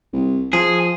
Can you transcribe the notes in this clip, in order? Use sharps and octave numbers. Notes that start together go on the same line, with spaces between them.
C2
F3 G#4